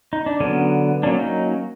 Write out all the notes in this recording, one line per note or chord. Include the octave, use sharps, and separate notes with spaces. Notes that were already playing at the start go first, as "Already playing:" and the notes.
D#4
D4
D3 F#3 B3 C#4
F#3 A#3 C#4 D4
D#4